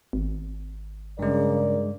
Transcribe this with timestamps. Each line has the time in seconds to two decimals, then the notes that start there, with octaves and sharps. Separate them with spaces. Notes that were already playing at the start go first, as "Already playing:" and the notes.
0.13 G#1
1.19 G2 C#3 G#3 A#4 D5